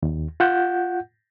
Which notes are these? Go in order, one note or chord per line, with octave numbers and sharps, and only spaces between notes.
D#2
F4 F#5 G6